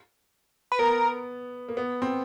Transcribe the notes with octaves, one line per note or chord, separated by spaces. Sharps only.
B4
B3 A#4
A#3
B3
C4